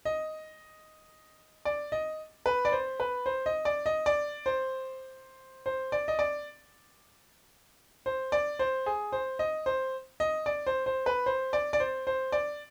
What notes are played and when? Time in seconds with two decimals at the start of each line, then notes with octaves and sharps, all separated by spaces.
0.05 D#5
1.65 D5
1.92 D#5
2.46 B4
2.65 D5
2.72 C5
3.00 B4
3.26 C5
3.46 D#5
3.65 D5
3.86 D#5
4.06 D5
4.46 C5
5.66 C5
5.92 D5
6.08 D#5
6.19 D5
8.06 C5
8.32 D5
8.59 C5
8.86 G#4
9.12 C5
9.39 D#5
9.66 C5
10.20 D#5
10.46 D5
10.67 C5
10.86 C5
11.06 B4
11.26 C5
11.53 D5
11.73 D5
11.80 C5
12.07 C5
12.32 D5